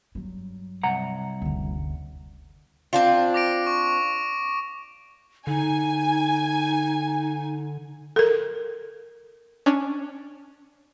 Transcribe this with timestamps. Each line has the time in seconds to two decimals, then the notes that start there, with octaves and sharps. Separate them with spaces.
0.15 G2 F#3
0.83 C2 F#5 A#5
1.42 F#1 D2
2.93 C4 D4 F4
3.34 D6 A#6 D7
3.67 C#6
5.47 D3 D#4 G#5
8.16 A4 A#4
9.66 C#4 D4